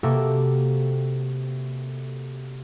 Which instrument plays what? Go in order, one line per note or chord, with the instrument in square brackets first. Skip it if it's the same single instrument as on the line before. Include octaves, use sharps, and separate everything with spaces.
[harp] C3 A#3 F#4 G4 A4